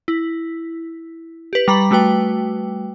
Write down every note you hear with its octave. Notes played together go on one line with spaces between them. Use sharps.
E4
G4 B4
G3 A#5 B5 B6 F#7
G3 A3 F#4 B4 G5